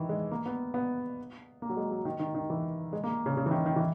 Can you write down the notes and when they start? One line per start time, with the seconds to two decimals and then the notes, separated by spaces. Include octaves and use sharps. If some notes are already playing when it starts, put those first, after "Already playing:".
Already playing: D#3 E3
0.09 G#3
0.31 A#3
0.46 B3
0.74 B3
1.62 A#3
1.70 F#3
1.77 G#3
1.91 F#3
2.05 D#3
2.19 D#3
2.35 D#3
2.50 E3
2.93 G#3
3.04 A#3
3.26 C#3
3.37 C#3
3.46 E3
3.51 D#3
3.66 D#3
3.76 E3